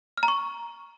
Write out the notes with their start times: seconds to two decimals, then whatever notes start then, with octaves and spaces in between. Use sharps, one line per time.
0.18 F6
0.23 A#5
0.28 C#6